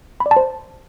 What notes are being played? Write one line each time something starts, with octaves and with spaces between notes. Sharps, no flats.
B5
D5
A5
C5